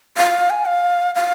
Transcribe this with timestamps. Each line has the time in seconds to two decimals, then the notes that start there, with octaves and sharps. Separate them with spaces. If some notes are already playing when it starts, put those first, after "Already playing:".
0.17 F5
0.50 G#5
0.67 F5
1.15 F5